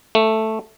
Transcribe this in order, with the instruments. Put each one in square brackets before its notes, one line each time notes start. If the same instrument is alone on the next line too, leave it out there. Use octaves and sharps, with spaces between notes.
[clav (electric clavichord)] A3